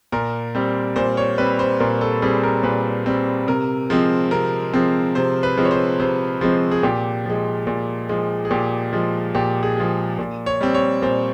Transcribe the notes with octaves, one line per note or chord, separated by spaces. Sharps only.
A#2 A#4
G3 C4
A#2 C5
C#5
G3 C4 B4
C5
A#2 A#4
A4
G3 C4 G#4
A#4
A#2 B4
G3 C4
C3 A#4
F3 G#3 C4
C3 A#4
F3 G#3 C4
C3 C5
B4
F3 G#3 C4
C#5
C5
C3 C5
F3 G#3 C4
G#4
A#2 G4
F3 G#3
A#2
F3 G#3
G#4
A#2 G4
F3 G#3
A#2 G4
G#4
F3 G#3
A#2
C#5
G3 C4
C#5
A#2 C5